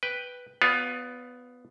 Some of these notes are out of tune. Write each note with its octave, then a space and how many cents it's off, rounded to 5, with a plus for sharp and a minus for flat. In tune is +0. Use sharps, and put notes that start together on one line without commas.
B4 +0 G5 +0
B3 +10 F4 +25 D5 -45